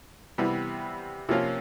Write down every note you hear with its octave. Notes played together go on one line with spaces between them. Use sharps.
C3 E3 G3 B3
C3 F3 A#3 C#4 F4